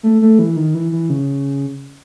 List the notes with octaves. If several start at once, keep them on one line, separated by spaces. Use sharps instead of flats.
A3
A3
E3
D#3
E3
E3
C#3